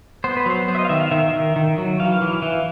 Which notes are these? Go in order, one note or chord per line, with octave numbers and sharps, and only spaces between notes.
B3 C5
B4
F#3 C5
B3 C5
E5
D#5
F5
D#3 E5
F5
D#3 E5
D#3
D#3
F#3
E3 F5
E3
E3